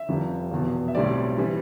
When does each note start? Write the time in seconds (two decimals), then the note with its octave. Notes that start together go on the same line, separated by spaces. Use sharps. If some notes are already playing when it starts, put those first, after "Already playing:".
Already playing: E5
0.09 F1 F2 C3 G3
0.51 F1 E2 B2
0.88 E5
0.95 B1 A2 G3 C4 D5
1.38 E3 G3